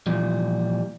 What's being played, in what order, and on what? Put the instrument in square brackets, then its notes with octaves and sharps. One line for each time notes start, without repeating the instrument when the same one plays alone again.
[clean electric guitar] A#2 E3 F3 G3